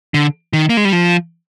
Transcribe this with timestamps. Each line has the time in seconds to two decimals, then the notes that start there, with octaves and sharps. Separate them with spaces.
0.14 D3
0.53 D#3
0.69 A#3
0.77 G#3
0.85 G3
0.93 F3